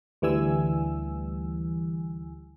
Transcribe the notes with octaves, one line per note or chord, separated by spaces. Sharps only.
D2 E3 G3 G#5 E6